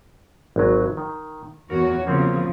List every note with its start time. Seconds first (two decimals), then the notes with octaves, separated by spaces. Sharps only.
0.56 G#1 F#3
0.97 D#3
1.70 E2 F#4 A#4 C#5
2.07 C#3 F3 A#3 C4 C#5